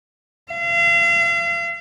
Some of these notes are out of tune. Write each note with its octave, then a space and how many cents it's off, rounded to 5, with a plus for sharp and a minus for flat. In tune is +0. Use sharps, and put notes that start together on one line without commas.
F5 -40